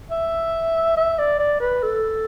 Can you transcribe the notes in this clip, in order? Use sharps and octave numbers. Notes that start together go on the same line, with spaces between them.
E5
E5
D5
D5
B4
A4